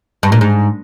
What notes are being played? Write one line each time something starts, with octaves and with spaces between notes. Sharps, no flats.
G2
A#2
G#2